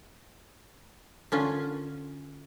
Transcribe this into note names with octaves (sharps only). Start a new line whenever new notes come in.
D3 C#4 F4